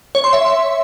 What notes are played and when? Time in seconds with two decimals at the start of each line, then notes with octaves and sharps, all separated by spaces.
0.15 C#5
0.24 C6
0.33 E5